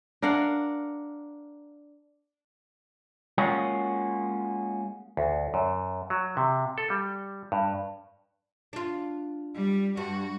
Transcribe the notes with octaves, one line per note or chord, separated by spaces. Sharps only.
D4 A#4 F5 F#5
G#3 A#3 C#4 F4 F#4
D2
F#2
F#3
C3
A4
G3
G2
D4 F4
G3
G2 F#4